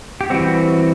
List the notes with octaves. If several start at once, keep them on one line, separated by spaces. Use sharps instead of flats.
G4
E3 G3 C4 F#4